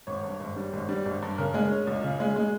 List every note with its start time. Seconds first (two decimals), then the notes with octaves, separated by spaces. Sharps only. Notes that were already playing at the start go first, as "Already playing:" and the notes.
0.07 G#1 C#5
0.23 G2
0.40 G#1
0.56 G3
0.73 G#1
0.89 G3
1.05 G#1
1.22 G2
1.38 C#3 A#4
1.54 G#3
1.71 C#4
1.87 C#2
2.04 C#3
2.20 G#3
2.36 G#3